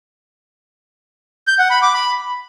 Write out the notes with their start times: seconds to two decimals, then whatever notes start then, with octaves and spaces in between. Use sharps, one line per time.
1.47 G6
1.59 F#5
1.71 B5
1.82 D6
1.94 B5